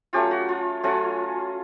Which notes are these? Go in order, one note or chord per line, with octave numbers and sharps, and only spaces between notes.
F#3 A3 C#4 F4 G4
F#4
F4
F#3 A3 C#4 F4 F#4